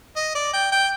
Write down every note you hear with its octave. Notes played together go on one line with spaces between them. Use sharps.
D#5
D5
G5
G5